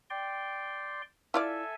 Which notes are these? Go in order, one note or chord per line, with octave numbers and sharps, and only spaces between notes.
D5 G5 C6
E4 F4 A4 D5 E5 G#5